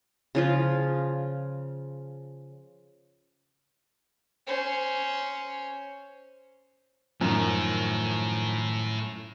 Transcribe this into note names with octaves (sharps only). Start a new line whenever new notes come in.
C#3 F3 F4
C#4 C5
F#2 A2 D#3 F3